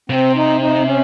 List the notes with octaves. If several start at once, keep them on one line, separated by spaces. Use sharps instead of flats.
C3 C4
D#4
D#4
C#4